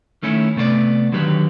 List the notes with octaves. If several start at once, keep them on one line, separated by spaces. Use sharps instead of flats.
D#3 A3 C#4 E4
C3 A3 B3 C5 D5
D3 D#3 F#3 G4 B4